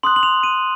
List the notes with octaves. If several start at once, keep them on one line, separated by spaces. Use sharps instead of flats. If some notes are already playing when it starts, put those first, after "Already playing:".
C6 D#6 F#6 F#7
F#7
F7
D#7